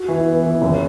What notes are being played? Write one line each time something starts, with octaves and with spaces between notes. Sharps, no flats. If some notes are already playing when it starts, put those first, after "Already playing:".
Already playing: F#4
E3
B3
E3
F#1